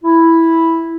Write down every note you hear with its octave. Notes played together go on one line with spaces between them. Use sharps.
E4